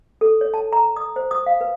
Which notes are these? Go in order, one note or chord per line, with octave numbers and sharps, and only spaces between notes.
A4
C#5
A5
A#5
D#6
C5
D#6
F5
B4